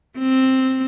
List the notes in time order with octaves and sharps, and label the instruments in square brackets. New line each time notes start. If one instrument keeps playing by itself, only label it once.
[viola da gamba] C4